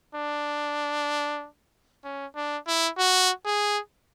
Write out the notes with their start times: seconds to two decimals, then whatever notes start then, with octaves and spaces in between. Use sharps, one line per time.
0.15 D4
2.04 C#4
2.35 D4
2.67 E4
2.98 F#4
3.45 G#4